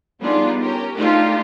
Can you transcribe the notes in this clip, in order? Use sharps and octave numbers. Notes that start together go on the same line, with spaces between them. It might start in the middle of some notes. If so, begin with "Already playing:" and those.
G3 B3 D4 D#4 F4 G#4
C#4 G4 A#4
A3 D4 D#4 F4 G4 A4